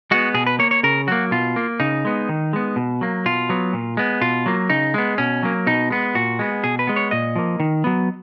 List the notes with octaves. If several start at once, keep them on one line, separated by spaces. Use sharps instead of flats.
G#3 B3 F#4
B2 G#4
B4
A#3 C#5
C#5
C#3 A#4
F#3 A#3 F#4
B2 F4
A#3
C#3 D#4
G#3 B3
D#3
G#3 B3
B2
F#3 A#3
B2 F4
F#3 B3
A#2
G#3 B3
B2 F4
F#3 A#3
C#3 D#4
G#3 B3
B2 C#4
F#3 A#3
B2 D#4
G#3 B3
A#2 F#4
G#3 B3
B2 G#4
B4
G#3 B3
C#5
A#2 D#5
F3 A#3
D#3
F#3 B3